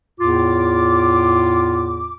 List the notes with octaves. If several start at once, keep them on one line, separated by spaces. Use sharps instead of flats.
E2 A2 F4 D6